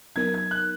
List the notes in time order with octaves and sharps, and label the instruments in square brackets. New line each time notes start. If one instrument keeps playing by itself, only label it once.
[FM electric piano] F#3 B3 D#4 A#4 [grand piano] G#6
[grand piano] G#6
F#6